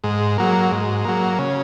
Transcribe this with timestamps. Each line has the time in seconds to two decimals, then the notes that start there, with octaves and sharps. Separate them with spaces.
0.04 G#2
0.38 F#3 A#3
0.71 G#2
1.05 F#3 A#3
1.39 C#3